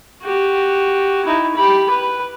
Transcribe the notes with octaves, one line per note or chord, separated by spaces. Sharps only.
F#4 G4
D#4 E4
G4 B5
B4